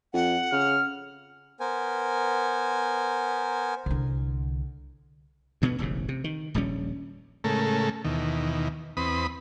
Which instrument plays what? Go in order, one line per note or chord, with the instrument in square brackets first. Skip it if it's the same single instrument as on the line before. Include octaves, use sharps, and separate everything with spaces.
[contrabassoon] F2 [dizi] F#5
[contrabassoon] C#3 [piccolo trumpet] F6
[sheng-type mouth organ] B3 A#4 C5 G#5
[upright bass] C2 D3
[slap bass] D2 B2 A#3 B3
E1 A1 G#2 C#3
C3
D#3
D#1 A#1 G3 C#4
[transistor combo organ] A2 C#3 G#3 A3 A4 A#4
D#2 B2 D#3 E3
E2 C4 B4 B5 D#6